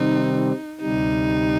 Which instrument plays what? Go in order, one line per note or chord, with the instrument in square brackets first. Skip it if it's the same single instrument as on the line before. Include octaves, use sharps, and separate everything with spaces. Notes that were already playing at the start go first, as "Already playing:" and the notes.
Already playing: [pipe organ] C3 D#3 G3 C4 [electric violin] D#4
[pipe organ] D2 C3 G3 [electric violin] D#4